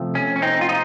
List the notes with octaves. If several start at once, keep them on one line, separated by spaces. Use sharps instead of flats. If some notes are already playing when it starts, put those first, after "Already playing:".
Already playing: C3 F3 A3
C#4
C#4
C4 D#4
F4
D#4